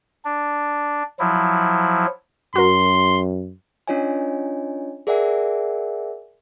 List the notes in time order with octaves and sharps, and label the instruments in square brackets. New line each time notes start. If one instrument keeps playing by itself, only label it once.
[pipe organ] D4
F3 F#3 E4
[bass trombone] F#2 [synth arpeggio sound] F#4 A#4 [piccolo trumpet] C6
[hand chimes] C#4 D4 F4 C#5 D#5 G#5
G#4 A#4 D5 E5 F#5 G#5